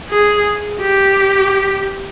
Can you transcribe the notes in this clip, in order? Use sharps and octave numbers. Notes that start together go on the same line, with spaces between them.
G#4
G4